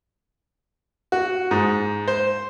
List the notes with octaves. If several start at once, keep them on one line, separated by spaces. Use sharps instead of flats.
F#4
G#2
C5